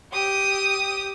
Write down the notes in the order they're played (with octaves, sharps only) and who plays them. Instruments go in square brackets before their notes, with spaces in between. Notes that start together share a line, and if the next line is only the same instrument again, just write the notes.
[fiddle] G4 D#6